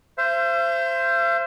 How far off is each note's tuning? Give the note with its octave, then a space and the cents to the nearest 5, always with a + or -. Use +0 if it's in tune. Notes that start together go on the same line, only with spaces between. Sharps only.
C5 +0 E5 +45